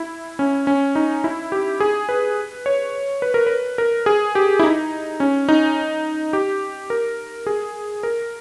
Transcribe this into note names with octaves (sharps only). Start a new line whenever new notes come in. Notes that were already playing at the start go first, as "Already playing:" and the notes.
Already playing: E4
C#4
C#4
D#4
E4
G4
G#4
B4
C#5
B4
A#4
B4
A#4
G#4
G4
E4
D#4
C#4
D#4
G4
A#4
G#4
A#4